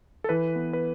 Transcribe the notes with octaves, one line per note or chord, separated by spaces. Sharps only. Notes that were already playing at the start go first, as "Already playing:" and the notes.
A4
E3 B4
B3
B4